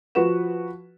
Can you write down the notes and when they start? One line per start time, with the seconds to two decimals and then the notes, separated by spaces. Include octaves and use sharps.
0.15 F3 F#4 B4 F#5 E7